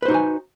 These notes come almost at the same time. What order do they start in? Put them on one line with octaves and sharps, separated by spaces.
B4 C5 D#4 F#4 G#5